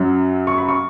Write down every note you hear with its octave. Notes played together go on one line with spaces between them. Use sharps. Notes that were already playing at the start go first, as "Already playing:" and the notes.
Already playing: F#2 F#3
C#6
B5
C#6